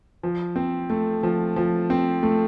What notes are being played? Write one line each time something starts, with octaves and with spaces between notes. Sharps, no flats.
F3
C4
A3
F3
F3
C4
A3